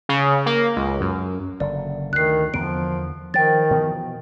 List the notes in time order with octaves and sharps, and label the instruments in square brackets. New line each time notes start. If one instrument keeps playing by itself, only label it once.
[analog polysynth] C#3
A#3
C#2
F#2
[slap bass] F#1 D3 [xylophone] D5
[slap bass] D2 [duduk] D#3 [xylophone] F#6 C7
[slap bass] E2 D3 B3 [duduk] F3 [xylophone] D7
[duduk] D#3 [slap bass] F3 [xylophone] G5 A6
[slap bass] B2 E3 F3